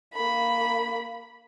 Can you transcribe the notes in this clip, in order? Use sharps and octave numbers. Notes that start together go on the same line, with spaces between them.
A#3 B5